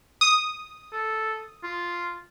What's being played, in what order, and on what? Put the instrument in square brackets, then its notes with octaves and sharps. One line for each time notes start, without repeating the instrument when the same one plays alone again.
[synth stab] D#6
[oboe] A4
F4